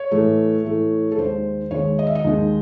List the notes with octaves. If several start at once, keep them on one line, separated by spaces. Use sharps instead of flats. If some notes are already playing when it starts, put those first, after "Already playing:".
Already playing: C#5
A2 E3 A3
A2 E3 A3
A4
D#2 D#3 G#3 C5
D#2 D#3 G#3 C#5
D#5
E5
D#5
D#2 D#3 G#3